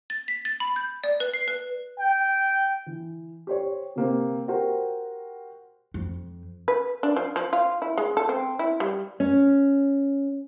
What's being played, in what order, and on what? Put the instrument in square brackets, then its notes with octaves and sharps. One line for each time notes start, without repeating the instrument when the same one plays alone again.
[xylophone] A6
B6
A6
B5
G6
D5
B4
C7
B4
[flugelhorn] G5
[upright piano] E3
G4 C5 C#5
C3 A#3 C4
F#4 G4 A#4 C5 G5
[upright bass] F2
[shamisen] B4
D4
F3
F3
F4
E4
G#3
A4
C4
E4
G3
[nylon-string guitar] C#4